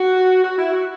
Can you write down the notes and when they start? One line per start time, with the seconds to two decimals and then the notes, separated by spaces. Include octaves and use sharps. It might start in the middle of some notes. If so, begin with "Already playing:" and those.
Already playing: F#4
0.44 F#4
0.58 E4
0.72 F#4